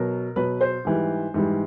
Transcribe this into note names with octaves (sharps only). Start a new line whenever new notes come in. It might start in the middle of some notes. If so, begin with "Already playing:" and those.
Already playing: B2 F#3 A#4
B2 F#3 B4
C5
G#2 E3 G3
G#2 E3 G3